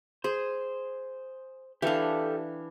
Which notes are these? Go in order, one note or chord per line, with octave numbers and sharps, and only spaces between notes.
G#4 C5
E3 D4 G4 A4 F5